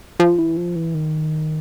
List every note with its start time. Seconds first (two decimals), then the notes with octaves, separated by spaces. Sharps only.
0.20 F3
0.38 E3
0.57 F3
0.76 E3
0.94 D#3